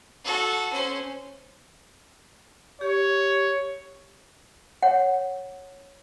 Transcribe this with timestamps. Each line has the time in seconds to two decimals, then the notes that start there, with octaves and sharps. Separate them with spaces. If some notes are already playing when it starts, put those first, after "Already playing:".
0.24 F#4 A4
0.72 C#4 C5
2.81 G4 C#5
4.83 C#5 F#5